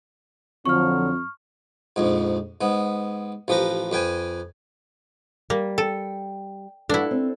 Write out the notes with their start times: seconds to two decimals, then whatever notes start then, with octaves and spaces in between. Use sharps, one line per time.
0.66 F2 D3 F3 F#3 C#6 F6
1.96 A#1 F2 G#2
2.61 G#2 B3
3.48 A1 F3 G4 B4 A#5
3.92 F2 B4 G5 G#5
5.50 G3 A#3
5.78 A4 G5
6.89 G2 D4 E4 F#4 A4
7.11 C4